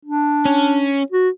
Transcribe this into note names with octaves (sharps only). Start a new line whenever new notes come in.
D4
C#4
F#4